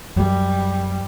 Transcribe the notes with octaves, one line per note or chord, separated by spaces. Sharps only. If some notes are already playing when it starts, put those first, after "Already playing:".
F#2 G3